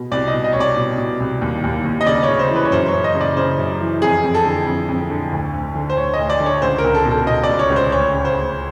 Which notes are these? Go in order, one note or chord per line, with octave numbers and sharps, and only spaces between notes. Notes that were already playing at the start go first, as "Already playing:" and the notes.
Already playing: B2
C2 D5
D#5
B2
D#5
C2 C#5
D5
B2
B2
C2
D#2
D#2
D#2
D#5
C#3 D5
C#5
C#3
C5
E3
B4
C#5
F#2 C5
C#5
F#2
D#5
C#3
D5
C#3 C5
F#2
E3
F2 G#4
F2
A4
D3
F2
F2
D3
D2
D2
D3
C5
D2 C#5
D#5
D2
D5
D3
C#5
C#2 C5
A#4
C#2
A4
B2
A4
B2 D#5
D5
C#2
C#5
C#2
C5
D2 C#5
C#3
C5
D2